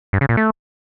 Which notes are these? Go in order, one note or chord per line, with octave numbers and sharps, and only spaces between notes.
G2
C#3
A#2
A3